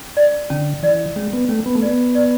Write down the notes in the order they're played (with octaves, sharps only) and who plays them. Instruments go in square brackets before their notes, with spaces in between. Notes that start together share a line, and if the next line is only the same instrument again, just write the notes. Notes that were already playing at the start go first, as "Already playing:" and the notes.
Already playing: [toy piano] C#4
D5
[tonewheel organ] D3 [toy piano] C#4
[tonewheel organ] E3 [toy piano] D5
[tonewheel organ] G#3 [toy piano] C#4
[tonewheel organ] B3
[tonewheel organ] A3 [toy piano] C#4
[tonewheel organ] B3
A3
[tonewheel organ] B3 [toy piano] D5
[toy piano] D5